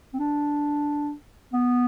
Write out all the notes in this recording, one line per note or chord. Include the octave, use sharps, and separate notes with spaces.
C4
D4
B3